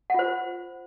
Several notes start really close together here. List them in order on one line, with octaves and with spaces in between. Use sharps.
F#5 F4 C5